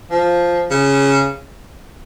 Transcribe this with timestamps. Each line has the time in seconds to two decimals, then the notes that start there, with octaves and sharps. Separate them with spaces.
0.11 F3
0.71 C#3